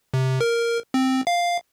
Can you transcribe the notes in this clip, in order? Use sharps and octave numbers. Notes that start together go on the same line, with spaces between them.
C3
A#4
C4
F5